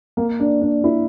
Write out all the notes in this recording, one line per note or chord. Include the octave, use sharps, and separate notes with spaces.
A#3
D4
D4
E4